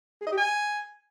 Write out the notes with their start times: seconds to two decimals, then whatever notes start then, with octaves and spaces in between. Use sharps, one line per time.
0.21 G#4
0.26 D#5
0.32 G4
0.37 G#5